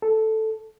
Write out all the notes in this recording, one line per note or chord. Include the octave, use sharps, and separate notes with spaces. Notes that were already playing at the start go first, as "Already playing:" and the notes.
A4